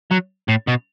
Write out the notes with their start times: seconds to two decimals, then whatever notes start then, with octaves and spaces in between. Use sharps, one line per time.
0.11 F#3
0.48 A2
0.67 B2